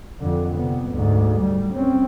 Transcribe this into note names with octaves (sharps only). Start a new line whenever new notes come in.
F2 D3
C3 B3
D2 G#2
G3
C4 C#4